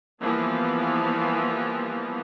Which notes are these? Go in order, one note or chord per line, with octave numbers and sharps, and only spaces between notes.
E3 F3 G3 A#3 B3